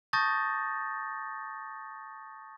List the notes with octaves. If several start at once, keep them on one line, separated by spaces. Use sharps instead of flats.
A5 C#6 D#6 G6 A6 A#6